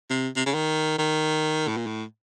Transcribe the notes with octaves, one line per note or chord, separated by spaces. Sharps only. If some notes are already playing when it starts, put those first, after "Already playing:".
C3
C3
C#3
D#3
D#3
A2
A#2
A2